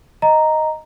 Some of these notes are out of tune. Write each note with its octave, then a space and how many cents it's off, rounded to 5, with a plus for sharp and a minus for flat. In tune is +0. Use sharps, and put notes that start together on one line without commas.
D#5 +0 A#5 +0